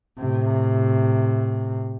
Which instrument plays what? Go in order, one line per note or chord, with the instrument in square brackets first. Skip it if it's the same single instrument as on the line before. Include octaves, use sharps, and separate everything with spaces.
[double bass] A2 C3